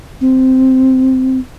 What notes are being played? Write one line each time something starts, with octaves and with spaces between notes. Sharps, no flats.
C4